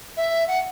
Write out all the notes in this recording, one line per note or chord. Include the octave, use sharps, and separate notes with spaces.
E5
F#5